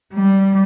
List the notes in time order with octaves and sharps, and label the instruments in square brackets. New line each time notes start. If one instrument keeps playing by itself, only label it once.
[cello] G3